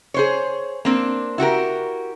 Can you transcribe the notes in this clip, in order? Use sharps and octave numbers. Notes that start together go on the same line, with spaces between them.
G#4 C5 C#5
A#3 C4 D4
E4 F#4 G4 A#4